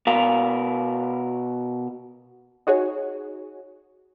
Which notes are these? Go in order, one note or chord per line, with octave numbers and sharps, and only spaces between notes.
B2 A#4 F5
D#4 F#4 G#4 C#5